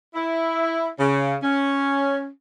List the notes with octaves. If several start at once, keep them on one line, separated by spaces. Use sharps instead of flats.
E4
C#3
C#4